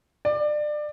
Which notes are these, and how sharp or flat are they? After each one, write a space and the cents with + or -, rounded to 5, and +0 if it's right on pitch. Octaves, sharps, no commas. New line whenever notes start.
D5 +25